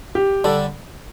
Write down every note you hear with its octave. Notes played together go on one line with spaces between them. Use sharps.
G4
D3 G3 D4 A4